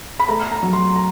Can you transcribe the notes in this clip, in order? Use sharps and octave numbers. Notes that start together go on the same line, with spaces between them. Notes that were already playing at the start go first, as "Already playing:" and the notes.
B5
A3 A#5
A#5
F#3
C6
A#5